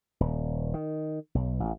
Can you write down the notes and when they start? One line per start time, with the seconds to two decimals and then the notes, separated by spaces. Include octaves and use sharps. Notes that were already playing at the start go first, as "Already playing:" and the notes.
0.20 D#1
0.74 D#3
1.35 B1
1.60 A1